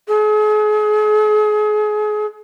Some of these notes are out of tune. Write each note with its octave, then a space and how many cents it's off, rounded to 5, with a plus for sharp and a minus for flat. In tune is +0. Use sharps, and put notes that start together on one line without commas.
G#4 +35